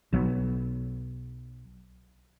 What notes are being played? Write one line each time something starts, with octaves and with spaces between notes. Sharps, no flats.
B1 F#3 B3